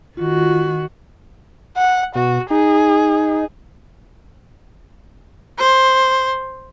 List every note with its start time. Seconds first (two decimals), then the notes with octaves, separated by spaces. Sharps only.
0.17 D#3 F4 F#4
1.77 F#5
2.15 B2 F#4
2.50 D#4 G#4
5.59 C5